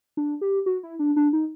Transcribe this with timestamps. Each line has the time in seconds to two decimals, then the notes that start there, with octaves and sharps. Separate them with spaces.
0.17 D4
0.41 G4
0.66 F#4
0.83 E4
0.99 D4
1.16 D4
1.33 D#4